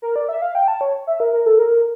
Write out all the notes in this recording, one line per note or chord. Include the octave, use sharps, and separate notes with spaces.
A#4
D5
E5
F5
G5
A5
C#5
E5
A#4
A#4
A4
A#4